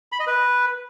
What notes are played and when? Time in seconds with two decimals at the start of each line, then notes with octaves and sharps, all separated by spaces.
0.12 B5
0.20 D#5
0.27 B4